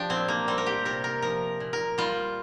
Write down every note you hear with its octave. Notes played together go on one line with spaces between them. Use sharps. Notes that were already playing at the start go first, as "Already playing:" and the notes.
Already playing: F3 D4 G4
A#2 C4
A#3
G3 C4
A#4
G4
C3 A#4
A#4
F3 A#4
A#2
A#4
G3 F4